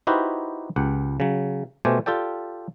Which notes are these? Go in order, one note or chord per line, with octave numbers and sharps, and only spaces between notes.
D#4 E4 F#4 G4 B4 C5
C#2 G4 F#5
C#3 F#3
B2 A3 G4 C5 G#5
F4 G4 A4 D5 G5